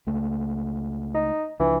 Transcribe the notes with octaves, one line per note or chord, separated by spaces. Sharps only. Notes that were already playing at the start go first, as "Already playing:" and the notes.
C#2 A3
D#4
C#2 E3 F3 D4